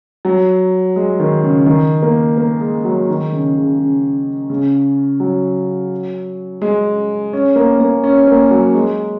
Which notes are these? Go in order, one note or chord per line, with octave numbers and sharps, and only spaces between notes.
F#3
G#3
D#3
C#3
D#3
A#3
A#3
G#3
F#3
D#3
C#3
C#3
C#3
C#3
F#3
G#3
C#4
A#3
A#3
C#4
A#3
F#3
G#3